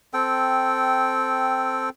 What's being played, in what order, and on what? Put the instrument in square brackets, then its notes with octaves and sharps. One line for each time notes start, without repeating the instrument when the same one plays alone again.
[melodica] C4 A4 G5